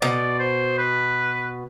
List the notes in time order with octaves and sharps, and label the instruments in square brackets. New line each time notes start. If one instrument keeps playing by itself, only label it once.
[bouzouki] B2 [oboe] D5
[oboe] C5
B4